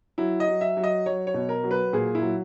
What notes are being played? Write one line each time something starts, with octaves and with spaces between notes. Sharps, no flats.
F#3 E4
D#5
F#3
E5
F#3
D#5
F#3 C#5
C#5
B2
A#4
F#3
B4
A#2 G#4
E4
F#3